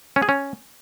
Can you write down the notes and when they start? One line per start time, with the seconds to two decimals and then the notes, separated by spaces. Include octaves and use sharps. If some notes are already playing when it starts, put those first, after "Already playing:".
0.16 C#4
0.22 G#4
0.29 C#4